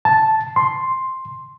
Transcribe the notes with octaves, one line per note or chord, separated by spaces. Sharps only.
A5
C6